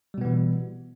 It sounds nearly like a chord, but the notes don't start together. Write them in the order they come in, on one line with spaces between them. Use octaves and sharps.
G3 B2 B3 E3